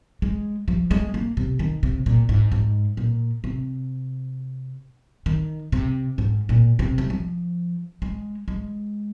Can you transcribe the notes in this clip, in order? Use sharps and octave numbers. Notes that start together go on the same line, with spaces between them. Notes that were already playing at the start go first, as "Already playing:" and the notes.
G#3
F3
G#3
A#3
C3
D#3
C3
A#2
G#2
G#2
A#2
C3
D#3
C3
G#2
A#2
C3
G#3
F3
G#3
G#3